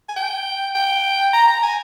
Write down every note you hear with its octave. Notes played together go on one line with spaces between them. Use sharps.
G#5
G5
G5
A#5
A#5
G#5